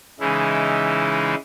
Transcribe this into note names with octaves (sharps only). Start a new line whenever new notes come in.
C#3 E3 G#3 D#4 E4